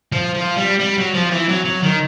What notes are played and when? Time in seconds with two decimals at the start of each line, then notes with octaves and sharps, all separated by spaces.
0.12 F3
0.35 F3
0.57 G3
0.80 G3
0.97 F#3
1.14 F3
1.30 E3
1.48 F#3
1.65 F#3
1.82 D#3